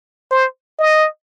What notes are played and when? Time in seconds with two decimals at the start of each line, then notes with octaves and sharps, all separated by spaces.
0.31 C5
0.79 D#5